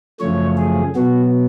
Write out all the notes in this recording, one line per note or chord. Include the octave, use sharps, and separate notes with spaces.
F#2 C#3 F3 A3 C#5
G#4
B2 F#3 B3 F#4